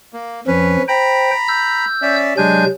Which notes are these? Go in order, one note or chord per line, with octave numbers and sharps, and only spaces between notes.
A#3
F2 F3 C#4 B4
C5 G5 A#5 B5
E6 G6
C#4 D5 E5
C3 F#3 G#3 D4 G#5 G6